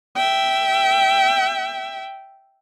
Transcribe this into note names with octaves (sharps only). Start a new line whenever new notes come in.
E5 G5